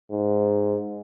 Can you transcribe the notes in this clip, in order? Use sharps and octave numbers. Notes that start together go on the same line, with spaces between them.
G#2